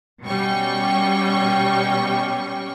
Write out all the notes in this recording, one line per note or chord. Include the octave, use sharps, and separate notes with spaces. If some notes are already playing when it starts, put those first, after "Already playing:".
B2 G3 C#4 G5 C#6